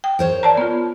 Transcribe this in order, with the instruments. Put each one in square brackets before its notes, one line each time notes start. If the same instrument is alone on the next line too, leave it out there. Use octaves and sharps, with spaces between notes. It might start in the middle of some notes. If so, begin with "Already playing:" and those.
[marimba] G5
[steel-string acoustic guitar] A#4 C5 C#5
[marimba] D5 A5 A#5
B3 F4